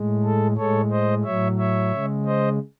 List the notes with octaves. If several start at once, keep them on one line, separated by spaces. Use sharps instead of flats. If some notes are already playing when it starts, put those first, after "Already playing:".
Already playing: A2 G#3
A4
A2 G#3 A4 C#5
C5 D#5
A2 F#3 C#5 E5
C#5 E5
C#3 G#3
C5 D#5